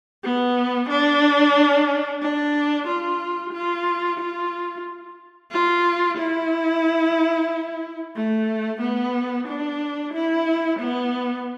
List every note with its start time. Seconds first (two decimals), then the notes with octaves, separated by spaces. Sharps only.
0.24 B3
0.89 D4
2.22 D4
2.87 F4
3.53 F4
4.20 F4
5.52 F4
6.17 E4
8.16 A3
8.81 B3
9.47 D4
10.13 E4
10.79 B3